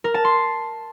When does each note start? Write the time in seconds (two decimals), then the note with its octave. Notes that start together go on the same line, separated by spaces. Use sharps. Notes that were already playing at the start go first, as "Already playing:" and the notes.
0.04 A#4
0.14 A5
0.25 C6